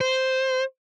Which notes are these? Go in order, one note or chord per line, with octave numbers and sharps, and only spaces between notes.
C5